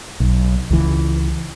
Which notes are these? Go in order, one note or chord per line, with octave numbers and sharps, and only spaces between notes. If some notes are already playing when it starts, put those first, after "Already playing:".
B1
C#2 E3